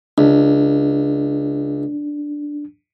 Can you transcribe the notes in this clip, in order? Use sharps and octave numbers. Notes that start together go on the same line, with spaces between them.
C#2 D4